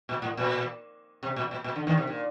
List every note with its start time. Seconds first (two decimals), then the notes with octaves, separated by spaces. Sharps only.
0.09 A#2
0.22 A2
0.37 A#2
1.23 C3
1.36 A#2
1.51 A#2
1.64 A#2
1.76 D3
1.87 D#2 D#3
1.97 C3
2.07 A#2